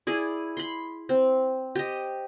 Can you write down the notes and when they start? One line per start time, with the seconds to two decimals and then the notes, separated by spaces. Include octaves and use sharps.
0.07 E4 G#4 D5
0.57 B5 C6
1.09 C4
1.75 G4 D#5